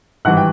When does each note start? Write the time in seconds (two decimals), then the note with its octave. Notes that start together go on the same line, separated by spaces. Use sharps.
0.25 G#1 G2 E3 F#5 F#6
0.37 G5